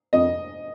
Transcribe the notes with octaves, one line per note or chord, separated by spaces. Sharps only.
F2 D#5